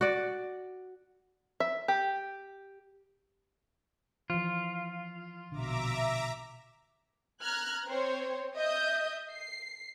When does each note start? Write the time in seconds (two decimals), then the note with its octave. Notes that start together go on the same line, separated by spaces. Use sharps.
0.01 F#4 D5
1.60 E5
1.88 G4
4.30 E3 F3 F4
5.52 A#1 B2 D3 E5 A#5 D6
7.41 A#5 F6 F#6 G#6
7.87 C4 C5 C#5
8.56 D#5 E5 D#6 G6
9.31 C7